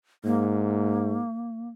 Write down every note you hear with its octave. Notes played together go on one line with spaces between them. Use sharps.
G#2 A#3